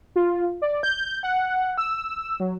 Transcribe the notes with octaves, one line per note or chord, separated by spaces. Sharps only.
F4
D5
G6
F#5
E6
F#3